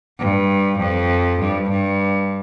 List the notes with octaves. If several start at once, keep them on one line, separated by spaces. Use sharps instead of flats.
G2
F2
G2
G2